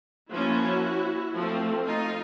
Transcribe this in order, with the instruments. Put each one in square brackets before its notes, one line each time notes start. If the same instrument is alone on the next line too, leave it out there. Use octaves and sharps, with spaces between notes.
[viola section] F3 A#3 C#4 E4 F#4
F3 A3 C4
D#4 F4